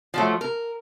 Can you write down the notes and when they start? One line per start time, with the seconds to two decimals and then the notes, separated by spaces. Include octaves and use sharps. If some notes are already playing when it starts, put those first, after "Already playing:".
0.14 F3 F#3 A3
0.41 A#4